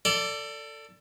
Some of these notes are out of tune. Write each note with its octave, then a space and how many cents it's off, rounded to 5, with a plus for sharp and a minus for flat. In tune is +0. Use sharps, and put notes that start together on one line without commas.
A4 +20 D5 -10